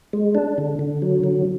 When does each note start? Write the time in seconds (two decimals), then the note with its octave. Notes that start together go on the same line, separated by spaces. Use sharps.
0.13 G#3
0.35 D4
0.58 D3
0.79 D3
1.02 F#3
1.24 D3